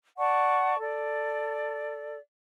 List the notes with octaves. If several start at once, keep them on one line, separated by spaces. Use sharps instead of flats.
D5 F#5 A5 C#6
A4 D5